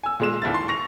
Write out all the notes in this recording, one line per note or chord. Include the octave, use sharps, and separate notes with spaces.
G#5 E6
A#2 G#3 E7
A#1 D#2 E4 A6
C6
C#6 A#6 F7